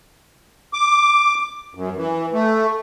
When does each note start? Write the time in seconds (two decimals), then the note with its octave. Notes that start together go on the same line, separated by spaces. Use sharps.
0.73 D6
1.75 F#2
1.97 E3
2.33 A3